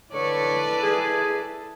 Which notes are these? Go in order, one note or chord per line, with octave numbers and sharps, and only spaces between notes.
D3 E4 A4 B4 C#5 D5 C#6
G#4